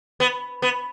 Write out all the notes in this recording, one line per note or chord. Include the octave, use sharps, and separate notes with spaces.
B3
B3